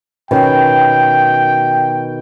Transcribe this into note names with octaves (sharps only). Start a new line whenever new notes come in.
B2 D#3 C#4 G5